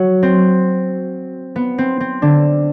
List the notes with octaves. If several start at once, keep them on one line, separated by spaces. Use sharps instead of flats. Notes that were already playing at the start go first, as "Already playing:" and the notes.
Already playing: F#3 F#4
C4
B3
C4
C4
D3 D4